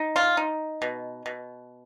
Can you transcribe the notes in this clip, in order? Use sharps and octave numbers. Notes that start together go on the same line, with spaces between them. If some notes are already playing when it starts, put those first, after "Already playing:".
Already playing: D#4
F4
D#4
B2
B2